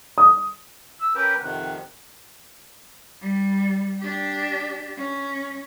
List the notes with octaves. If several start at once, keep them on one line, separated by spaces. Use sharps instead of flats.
D#6
E6
C#4 G4 A#4 B4
F2 C3 D#3 F#5
G3
D4 G4
C#4